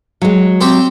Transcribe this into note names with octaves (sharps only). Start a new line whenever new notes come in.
F#3 G#3
C4 G4 C5